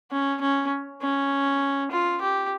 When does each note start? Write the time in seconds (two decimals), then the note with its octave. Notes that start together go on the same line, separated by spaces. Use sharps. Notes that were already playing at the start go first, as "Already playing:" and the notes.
0.11 C#4
0.41 C#4
1.02 C#4
1.92 F4
2.21 G4